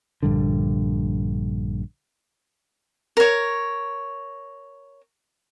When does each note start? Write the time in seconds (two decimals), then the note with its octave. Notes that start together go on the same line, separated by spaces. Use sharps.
0.23 A#1 G2 D3
3.17 A#4 C#5